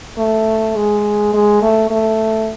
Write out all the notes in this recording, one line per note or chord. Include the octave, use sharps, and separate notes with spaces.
A3
G#3
G#3
A3
A3